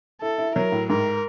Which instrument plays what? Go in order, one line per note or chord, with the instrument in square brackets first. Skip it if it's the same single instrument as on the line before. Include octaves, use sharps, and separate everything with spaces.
[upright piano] E4 [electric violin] A4
[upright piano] E4
[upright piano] F#3 [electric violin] A#4
[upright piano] A2
[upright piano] G#2 [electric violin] A#4